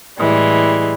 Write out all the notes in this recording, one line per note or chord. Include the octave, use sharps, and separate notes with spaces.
A2 E3 G3 G#3